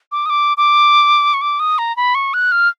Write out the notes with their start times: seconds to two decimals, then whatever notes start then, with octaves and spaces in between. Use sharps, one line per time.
0.12 D6
0.26 D#6
0.30 D6
0.57 D6
1.34 C#6
1.41 D6
1.60 D#6
1.78 A#5
1.96 B5
2.15 C#6
2.34 F#6
2.52 F6